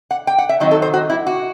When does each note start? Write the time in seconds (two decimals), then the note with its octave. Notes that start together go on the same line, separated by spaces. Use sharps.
0.11 F#5
0.27 G5
0.38 F#5
0.49 E5
0.60 D#3 F#3 C4 D#4 D#5
0.71 A4
0.82 C5
0.94 F#4
1.10 E4
1.27 F#4